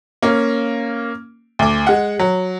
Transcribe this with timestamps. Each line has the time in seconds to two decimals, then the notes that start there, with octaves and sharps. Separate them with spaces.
0.22 A#3 C#4
1.59 D2 D6
1.87 G#3 F#5
2.19 F#3